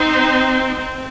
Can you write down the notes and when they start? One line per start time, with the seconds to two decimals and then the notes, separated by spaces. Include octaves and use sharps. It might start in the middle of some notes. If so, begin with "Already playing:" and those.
Already playing: C4 D#4 C5
0.79 C4